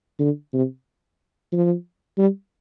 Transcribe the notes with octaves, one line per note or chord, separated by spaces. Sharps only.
D3
C3
F3
G3